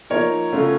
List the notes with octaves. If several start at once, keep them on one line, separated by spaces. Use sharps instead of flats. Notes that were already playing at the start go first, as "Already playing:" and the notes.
F3 A#3 D#4 A#4 C#5
C#3 F#3 A3 C#4 F4